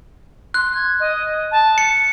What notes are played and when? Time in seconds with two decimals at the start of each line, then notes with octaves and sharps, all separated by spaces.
0.54 C6 F#6
0.74 G#6
1.00 D#5
1.52 A5
1.78 C#7